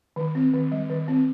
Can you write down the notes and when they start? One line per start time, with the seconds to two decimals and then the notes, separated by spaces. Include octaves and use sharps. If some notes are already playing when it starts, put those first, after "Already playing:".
0.16 D#3
0.35 C4
0.54 D#3
0.72 G3
0.90 D#3
1.08 C4